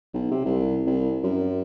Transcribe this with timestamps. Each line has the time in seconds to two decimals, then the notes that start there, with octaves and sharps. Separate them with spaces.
0.14 B1
0.31 C3
0.45 C2
0.86 C2
1.23 F#2